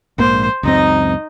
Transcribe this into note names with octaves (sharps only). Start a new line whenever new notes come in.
A#1 G#2 A#3 C5
C#2 F#2 C4 D#4 D#5